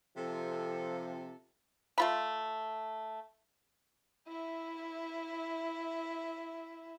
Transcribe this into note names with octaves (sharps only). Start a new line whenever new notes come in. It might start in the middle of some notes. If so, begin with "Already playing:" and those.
C3 F3 A4
A3 F4 B5
E4 E5